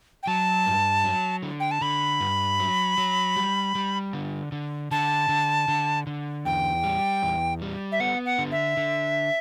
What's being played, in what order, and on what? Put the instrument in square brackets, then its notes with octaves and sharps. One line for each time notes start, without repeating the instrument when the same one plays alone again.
[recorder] G5
[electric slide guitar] F#3 [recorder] A5
[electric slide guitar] G2
F#3
D3
[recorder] G5
A5
[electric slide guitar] D3 [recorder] B5
[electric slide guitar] G2
F#3
F#3
G3
G3
D3
D3
[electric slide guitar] D3 [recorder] A5
[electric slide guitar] D3
D3
D3
[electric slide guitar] E2 [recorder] G5
[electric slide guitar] G3
E2
G3
[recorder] E5
[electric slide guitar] B3 [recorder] F#5
[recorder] F#5
[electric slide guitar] D3
[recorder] E5
[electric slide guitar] D3